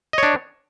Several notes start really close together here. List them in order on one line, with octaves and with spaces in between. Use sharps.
D#5 C#5 D4